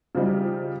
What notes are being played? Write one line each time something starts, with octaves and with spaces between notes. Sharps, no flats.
C#3 F3 G3 D#4